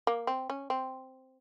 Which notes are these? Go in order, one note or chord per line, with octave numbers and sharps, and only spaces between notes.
A#3
C4
C#4
C4